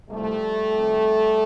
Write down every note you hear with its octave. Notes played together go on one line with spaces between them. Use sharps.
C2 C3 F3 G3 A3
F2 C3 D#3